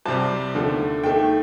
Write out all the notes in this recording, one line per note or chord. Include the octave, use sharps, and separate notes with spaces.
C2 C3 G3 A5
D#2 D3 F3 A3
D#2 D#3 A3 G5